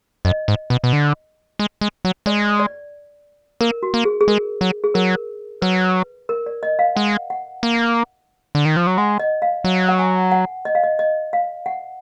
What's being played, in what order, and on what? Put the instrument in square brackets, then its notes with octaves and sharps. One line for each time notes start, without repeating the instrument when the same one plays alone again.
[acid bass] F#2 [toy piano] D#5
[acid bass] G#2
B2
B2
D3
G#3
G#3
F#3
[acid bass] G#3 [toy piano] D5
[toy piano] D5
[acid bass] A#3 [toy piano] A#4
[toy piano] F#4
[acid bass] A#3
[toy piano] G#4
G#4
[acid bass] G#3 [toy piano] A#4
[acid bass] F#3
[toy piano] G#4
[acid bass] F#3 [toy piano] A#4
[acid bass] F#3 [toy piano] B4
[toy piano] A#4
D5
D#5
F5
[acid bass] G#3 [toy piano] F#5
[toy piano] F#5
[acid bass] A#3
D3
D#3
F3
F#3
[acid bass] G#3 [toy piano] F#5
[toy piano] D#5
F5
[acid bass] F#3
[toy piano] F#5
G#5
F#5
D#5
F5
D#5
D#5
F5
F#5